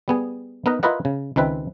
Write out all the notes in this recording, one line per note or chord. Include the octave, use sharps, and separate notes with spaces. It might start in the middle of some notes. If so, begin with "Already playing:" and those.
G3 B3 G#4
B3 D#4 A#4 B4 D#5
E4 F4 A#4 B4 D#5 F#5
C#3
C#2 D#3 C4 B4 E5